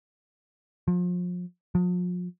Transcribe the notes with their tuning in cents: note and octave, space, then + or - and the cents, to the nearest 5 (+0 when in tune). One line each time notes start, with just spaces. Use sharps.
F3 +35
F3 +40